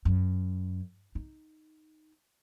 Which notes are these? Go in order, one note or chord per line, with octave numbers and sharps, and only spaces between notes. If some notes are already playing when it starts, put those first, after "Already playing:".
F#2
D#4